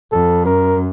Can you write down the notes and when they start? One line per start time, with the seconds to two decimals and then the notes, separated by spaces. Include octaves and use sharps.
0.12 F2 A4
0.45 F#2 A#4